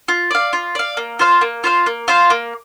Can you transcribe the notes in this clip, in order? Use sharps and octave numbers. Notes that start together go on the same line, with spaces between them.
F4
D5 F5
F4
D5 F5
A#3
F4 C5 F5
A#3
F4 C5 F5
A#3
F4 C5 F5
A#3